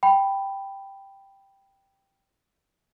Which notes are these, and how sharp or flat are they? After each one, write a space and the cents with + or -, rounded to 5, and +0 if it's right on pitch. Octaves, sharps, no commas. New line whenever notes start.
G5 +0 B5 +0